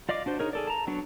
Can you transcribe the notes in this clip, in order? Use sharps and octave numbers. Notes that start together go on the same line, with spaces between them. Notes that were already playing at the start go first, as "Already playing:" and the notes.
F4 D5 D#5 F5 D6
D4 F#4 C5
D#4 G#4 A#4 C#5
G#4 A4 D5
A5 A#5
F#3 B3 D4 F#4